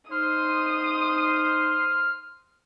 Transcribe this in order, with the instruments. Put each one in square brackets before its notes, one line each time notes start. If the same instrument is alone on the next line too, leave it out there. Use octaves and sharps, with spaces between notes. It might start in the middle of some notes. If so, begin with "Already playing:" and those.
[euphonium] D#4 [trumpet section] C5 C6 [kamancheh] D#6 [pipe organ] F6